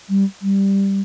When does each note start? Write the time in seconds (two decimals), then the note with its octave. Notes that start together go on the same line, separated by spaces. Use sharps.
0.09 G3
0.42 G3